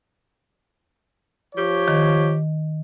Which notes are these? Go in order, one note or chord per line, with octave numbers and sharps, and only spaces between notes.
F3 G4 C#5
D#3